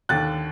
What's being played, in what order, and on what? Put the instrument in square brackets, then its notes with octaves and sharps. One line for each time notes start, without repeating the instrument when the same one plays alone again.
[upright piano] D#2 D3 F#6 A6